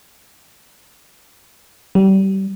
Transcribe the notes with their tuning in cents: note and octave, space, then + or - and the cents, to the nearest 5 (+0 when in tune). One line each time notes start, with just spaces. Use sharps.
G3 -30